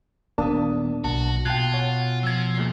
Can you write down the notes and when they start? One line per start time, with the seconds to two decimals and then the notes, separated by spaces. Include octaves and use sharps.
0.38 D#1 A#3 B3 D4 A5 D#6
1.04 B1 F#4 A5
1.45 B2 F4 G5 A5 F#6 G#6 C7
1.74 C#5 F#5 G#5
2.23 F3 E6 G#6
2.55 D#1 A#2 C7